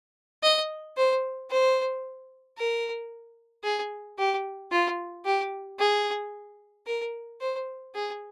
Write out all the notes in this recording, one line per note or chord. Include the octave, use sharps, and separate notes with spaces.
D#5
C5
C5
A#4
G#4
G4
F4
G4
G#4
A#4
C5
G#4